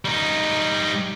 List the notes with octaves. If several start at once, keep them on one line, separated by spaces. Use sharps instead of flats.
G3 D#4